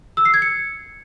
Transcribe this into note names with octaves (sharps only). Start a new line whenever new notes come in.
E6
C7
G#6
C#7